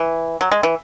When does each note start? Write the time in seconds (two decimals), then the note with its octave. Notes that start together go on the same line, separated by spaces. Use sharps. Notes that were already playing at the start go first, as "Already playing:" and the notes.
Already playing: E3
0.41 F#3
0.51 G#3
0.63 E3